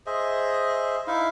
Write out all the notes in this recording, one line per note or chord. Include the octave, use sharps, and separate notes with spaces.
G#4 C5 D#5 E5
D#4 E4 E5 F5